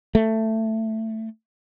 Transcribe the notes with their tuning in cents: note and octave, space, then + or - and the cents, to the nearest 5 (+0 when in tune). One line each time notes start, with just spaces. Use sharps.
A3 +10